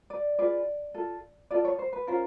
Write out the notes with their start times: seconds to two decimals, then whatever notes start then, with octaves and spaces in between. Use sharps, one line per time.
0.10 D5
0.39 F4 G#4 B4 D5
0.94 F4 A4
1.51 F4 A4 D5
1.65 C#5
1.79 C5
1.93 B4
2.07 C#4 F4 A#4 C5